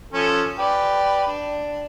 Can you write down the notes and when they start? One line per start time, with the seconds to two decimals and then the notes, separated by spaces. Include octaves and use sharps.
0.13 F3 C#4 A4
0.59 G4 B4 D5
1.27 D4